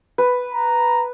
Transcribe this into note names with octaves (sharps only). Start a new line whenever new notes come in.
B4
A#5